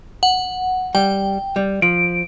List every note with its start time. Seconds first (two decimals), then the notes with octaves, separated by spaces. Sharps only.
0.23 F#5
0.95 G3 G5
1.56 G3
1.82 F3 D7